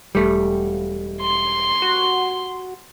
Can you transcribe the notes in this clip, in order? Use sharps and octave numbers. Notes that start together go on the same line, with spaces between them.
E1 G3 A3
C6
F#4